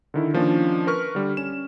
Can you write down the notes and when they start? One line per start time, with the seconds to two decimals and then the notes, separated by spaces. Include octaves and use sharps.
0.14 D3 D#3 E4
0.34 D#3 F3 A#3 C#4 D4
0.87 A#4 B4 C#6 F6
1.15 D3 G3
1.37 C#4 E7